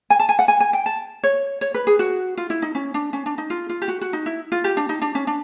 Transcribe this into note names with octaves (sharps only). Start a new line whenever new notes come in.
G#5
A5
G#5
F#5
G#5
G#5
G5
A5
C#5
C#5
B4
G#4
F#4
F4
E4
D#4
C#4
D4
C#4
D4
D#4
F4
F4
G4
F#4
F#4
D#4
E4
F4
G4
D4
D#4
D4
C#4
D4